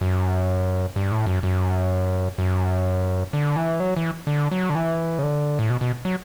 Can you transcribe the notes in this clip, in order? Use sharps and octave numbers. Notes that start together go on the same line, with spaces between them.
F#2
G2
A2
F#2
F#2
F#2
D3
E3
F#3
E3
D3
F#3
D3
E3
C#3
D3
A2
B2
B2
F#3